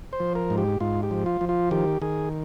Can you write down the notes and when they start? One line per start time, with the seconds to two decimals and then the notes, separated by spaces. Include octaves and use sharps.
0.13 C5
0.20 F3
0.35 A#4
0.50 G#2
0.58 G4
0.80 G#2 F4
1.03 G4
1.11 F3
1.26 F4
1.41 F3
1.49 F4
1.71 D#3 G4
2.02 D#3 G#4